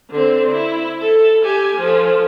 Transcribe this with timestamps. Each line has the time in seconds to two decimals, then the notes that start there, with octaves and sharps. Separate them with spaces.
0.11 D3 C4
0.52 E4
1.01 A4
1.44 G4 G#5
1.77 F3 A4